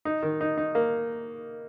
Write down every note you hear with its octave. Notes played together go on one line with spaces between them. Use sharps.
D#4
D#3
D#4
D#4
A#3